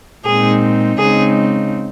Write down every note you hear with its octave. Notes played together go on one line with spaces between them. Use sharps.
A#2 G#3 C4 D#4 G#4
C#3 G#3 C4 D#4 G#4